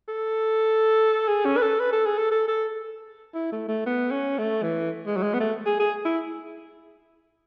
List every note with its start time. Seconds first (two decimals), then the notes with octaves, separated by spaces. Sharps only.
0.08 A4
1.28 G#4
1.45 C#4
1.57 B4
1.62 A4
1.80 B4
1.93 A4
2.06 G#4
2.18 A4
2.32 A4
2.48 A4
3.35 E4
3.52 A3
3.68 A3
3.86 B3
4.11 C#4
4.38 A3
4.63 E3
5.07 G#3
5.17 F#3
5.23 G#3
5.34 B3
5.40 A3
5.66 G#4
5.80 G#4
6.05 E4